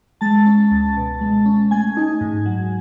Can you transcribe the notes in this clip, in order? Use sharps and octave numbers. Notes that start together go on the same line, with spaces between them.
G#3 A5 A6
C#4
C#2
B2
G#3
C#4
A3 G#5 G#6
D#4
G#2
F#3